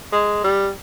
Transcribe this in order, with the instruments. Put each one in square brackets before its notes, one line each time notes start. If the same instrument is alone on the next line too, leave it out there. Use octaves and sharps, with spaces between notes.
[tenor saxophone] G#3
G3